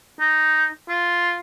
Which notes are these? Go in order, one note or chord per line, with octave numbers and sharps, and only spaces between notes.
D#4
F4